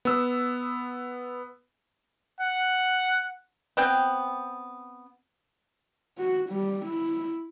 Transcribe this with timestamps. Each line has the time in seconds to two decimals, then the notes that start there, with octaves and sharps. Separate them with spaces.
0.05 B3 E6
2.40 F#5
3.77 B3 C4 G5
6.18 F#4
6.49 G3
6.85 E4